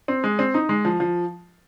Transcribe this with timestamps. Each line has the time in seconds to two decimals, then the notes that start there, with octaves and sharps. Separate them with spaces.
0.08 C4
0.24 G#3
0.39 C4
0.54 D#4
0.69 G#3
0.85 F3
1.00 F3